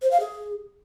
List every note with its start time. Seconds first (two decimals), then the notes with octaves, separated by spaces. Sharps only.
0.02 C5
0.11 F5
0.20 G#4